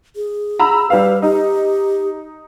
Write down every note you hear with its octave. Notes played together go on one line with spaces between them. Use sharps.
G#4
A#5 B5 E6
G3 B4 F5
D#4 G4